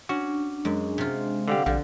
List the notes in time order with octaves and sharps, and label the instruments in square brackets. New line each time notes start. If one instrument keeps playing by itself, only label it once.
[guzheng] C#4 [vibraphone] D4 [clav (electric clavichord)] F#4
[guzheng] F#2 [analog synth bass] G#3
[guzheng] C3 F4
[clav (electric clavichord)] D3 G3 G4 [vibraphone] F5 F#5
[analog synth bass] A#1 [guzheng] D3 [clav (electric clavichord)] G3